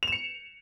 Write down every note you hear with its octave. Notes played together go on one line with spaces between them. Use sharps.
C#7 E7 F7